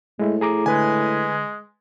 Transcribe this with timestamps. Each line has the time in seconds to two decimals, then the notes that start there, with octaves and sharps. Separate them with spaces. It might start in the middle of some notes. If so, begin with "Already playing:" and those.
0.19 A2 G#3 E4
0.41 G#4 A#5 D6
0.66 D3 G#3 B4 G#5